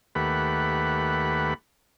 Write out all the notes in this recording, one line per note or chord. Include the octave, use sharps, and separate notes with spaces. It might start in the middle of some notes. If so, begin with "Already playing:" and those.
D#2 A3 G4 B4 F#5 B5